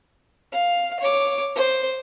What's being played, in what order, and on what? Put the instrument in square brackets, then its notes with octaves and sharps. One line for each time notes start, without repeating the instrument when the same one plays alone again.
[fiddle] F5
C#5 D6
C5